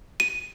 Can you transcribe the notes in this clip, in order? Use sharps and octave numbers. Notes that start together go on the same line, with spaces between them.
D#7